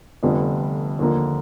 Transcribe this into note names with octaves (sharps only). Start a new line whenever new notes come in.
F1 F2 D3 G3 B3
D#2 D3 F3 A#3